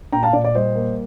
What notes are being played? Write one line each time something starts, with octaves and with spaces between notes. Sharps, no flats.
A#2 G5 A#5
F5 A5
A#2 D5
D5
G3 C5 D#5
A#3